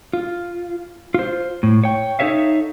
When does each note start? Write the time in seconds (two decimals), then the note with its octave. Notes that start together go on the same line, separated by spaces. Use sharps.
0.13 F4
1.14 F4 C5
1.63 A2
1.84 C#5 G5
2.19 D#4 E4 A4 C#5 E5 F5